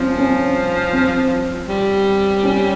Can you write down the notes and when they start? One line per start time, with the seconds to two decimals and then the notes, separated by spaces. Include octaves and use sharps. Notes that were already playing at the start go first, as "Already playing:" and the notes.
Already playing: F3 C4 C#4
0.18 C#4
0.93 C4
1.69 G3
2.43 C#4